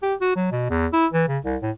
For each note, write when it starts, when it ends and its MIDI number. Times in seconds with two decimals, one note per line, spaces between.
0.02 0.14 67
0.21 0.36 66
0.36 0.50 54
0.52 0.69 47
0.70 0.87 40
0.93 1.06 64
1.13 1.25 52
1.28 1.38 49
1.44 1.56 36
1.62 1.71 45